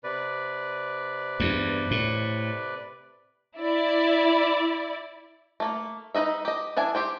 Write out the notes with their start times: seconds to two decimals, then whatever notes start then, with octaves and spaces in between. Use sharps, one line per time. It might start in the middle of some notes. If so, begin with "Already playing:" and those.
0.04 C3 B4 D5
1.40 E2 G2
1.91 A2
3.57 E4 D5
5.60 A3 A#3
6.15 D#4 B4 D#5 E5
6.45 G4 D#5
6.77 E3 D4 E5 G#5
6.95 G4 C5 G5